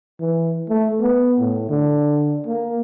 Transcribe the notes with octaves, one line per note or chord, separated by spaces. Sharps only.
E3
A3
B3
A2
D3
A#3